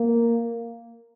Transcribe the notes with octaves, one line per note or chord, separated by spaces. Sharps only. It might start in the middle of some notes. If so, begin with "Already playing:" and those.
Already playing: A#3